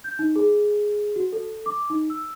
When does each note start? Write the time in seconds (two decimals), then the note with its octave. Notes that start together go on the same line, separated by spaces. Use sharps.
0.04 G6
0.19 D#4
0.36 G#4
1.16 F#4
1.32 A4
1.66 D6
1.90 D#4
2.10 E6